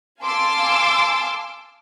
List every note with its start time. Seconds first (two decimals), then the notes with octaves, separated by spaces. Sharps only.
0.23 F5 G#5 A5 C6 D6 E6